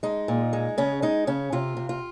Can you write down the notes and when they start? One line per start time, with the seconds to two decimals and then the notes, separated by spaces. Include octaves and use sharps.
0.03 G#3 D#4
0.28 A#2
0.53 G#3
0.78 C#3 C#4
1.02 G#3 D#4
1.27 C#3 C#4
1.52 C3 F4
1.77 C3
1.89 F4